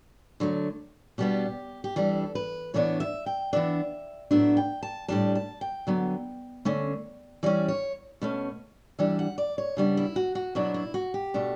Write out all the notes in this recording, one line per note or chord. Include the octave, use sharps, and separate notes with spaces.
D3 F#3 A3
B2 G3 B3 D4 G4
G4
E3 G3 D4 A4
B4
A2 E3 B3 D4 C#5
E5
G5
E3 B3 D4 E5
A2 F#3 B3 D4 E5
G5
A5
A2 G3 D4 A5
A5
G5
D3 F#3 B3
D3 A3 C#4
E3 G3 C#4 D5
C#5
B2 A3 C#4
E3 G3 D4 E5
F#5
D5
C#5
C#3 G3 B3 D4
E4
F#4
F#4
B2 F#3 B3 D4 E4
E4
F#4
G4
B2 A3 D4